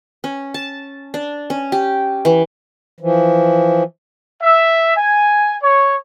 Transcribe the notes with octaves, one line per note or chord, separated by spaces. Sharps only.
C#4
A5
D4
C#4
G4
E3
E3 F3
E5
G#5
C#5